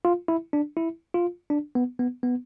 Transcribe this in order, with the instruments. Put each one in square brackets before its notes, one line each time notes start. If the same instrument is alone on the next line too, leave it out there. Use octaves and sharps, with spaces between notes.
[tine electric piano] F4
E4
D4
E4
F4
D4
B3
B3
B3